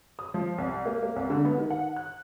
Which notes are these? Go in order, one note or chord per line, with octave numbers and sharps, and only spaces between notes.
D#6
F3
C2
A#3
A#3
C2
D3
B3
D#3
F#5
F#6